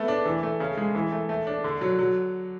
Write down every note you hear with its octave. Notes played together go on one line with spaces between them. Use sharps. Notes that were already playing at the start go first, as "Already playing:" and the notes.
Already playing: A3 B3
D4
E3
A3
C#3
G#3
E3
A3
A3
D4
D3
F#3
F#3